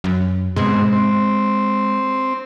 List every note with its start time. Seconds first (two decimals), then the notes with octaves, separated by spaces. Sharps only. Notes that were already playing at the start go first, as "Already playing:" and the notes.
0.04 F#2
0.56 G#2 B2 G#3 C4
0.92 C4